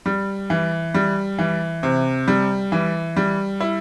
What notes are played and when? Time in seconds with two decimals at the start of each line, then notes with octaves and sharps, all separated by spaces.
0.06 G3
0.50 E3
0.94 G3
1.39 E3
1.83 C3
2.28 G3
2.72 E3
3.17 G3
3.60 E4